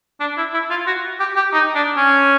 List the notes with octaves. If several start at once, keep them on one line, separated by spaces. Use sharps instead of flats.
D4
E4
E4
F4
F#4
G4
G4
D#4
D4
C#4